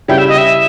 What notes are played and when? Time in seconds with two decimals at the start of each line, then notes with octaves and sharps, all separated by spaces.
0.08 C#3 G3 C#4 E4 G5
0.18 E5
0.28 D#5
0.38 E5